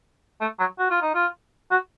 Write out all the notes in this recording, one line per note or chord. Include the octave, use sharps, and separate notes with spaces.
A3
F#3
F#4
F4
D#4
F4
F#4